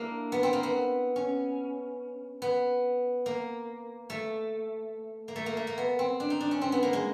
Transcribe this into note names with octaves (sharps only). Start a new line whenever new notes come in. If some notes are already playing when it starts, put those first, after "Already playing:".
Already playing: A#3 D4 E4
B3
C4
A#3
B3
C#4
B3
A#3
A3
A#3
A3
A#3
A3
A#3
B3
C4
D4
D#4
D4
C#4
C4
B3
A#3
G#3